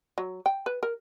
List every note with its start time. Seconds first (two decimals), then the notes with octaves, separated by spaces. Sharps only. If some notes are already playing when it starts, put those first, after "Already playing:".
0.18 F#3
0.46 G5
0.66 B4
0.83 A#4